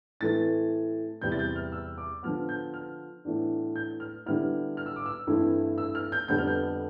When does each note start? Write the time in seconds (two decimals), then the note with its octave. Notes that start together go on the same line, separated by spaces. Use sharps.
0.20 A2 E3 A3 C4 A6
1.22 E2 C3 G3 C4 E4 G6
1.32 A6
1.39 G6
1.56 F6
1.72 E6
1.98 D6
2.23 D3 F3 B3 F6
2.49 G6
2.74 F6
3.25 A2 E3 B3 D4
3.76 G6
4.00 F6
4.26 D3 G3 B3 E4 F6
4.77 F6
4.86 E6
4.96 D6
5.06 E6
5.27 G2 E3 A3 C4 E4
5.78 E6
5.95 F6
6.12 G6
6.28 F2 D3 G3 B3 G6
6.38 F6
6.47 G6